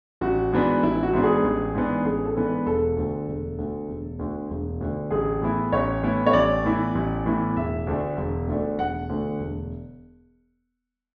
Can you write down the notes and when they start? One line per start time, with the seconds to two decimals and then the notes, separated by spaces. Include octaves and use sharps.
0.21 A1 F#4
0.52 G#2 E3 B3 D4
0.83 A1 E4
1.03 F#4
1.13 G#2 E3 B3 D4
1.23 G#4
1.44 A1
1.74 G#2 E3 B3 D4
2.04 A1 G#4
2.25 A4
2.36 G#2 E3 B3 D4
2.46 B4
2.66 E1 A4
2.97 D2 D3
3.27 E1
3.58 D2 D3
3.88 E1
4.19 D2 D3
4.50 E1
4.81 D2 D3
5.11 A1 G#4
5.42 A2 E3 B3 E4
5.72 A1 C#5
6.03 A2 E3 B3 E4
6.26 C#5
6.33 A1 D5
6.64 A2 E3 B3 E4
6.95 A1
7.26 A2 E3 B3 E4
7.56 E1 E5
7.87 D2 D3 A3 D4
8.17 E1
8.48 D2 D3 A3 D4
8.78 E1 F#5
9.09 D2 D3 A3 D4
9.40 E1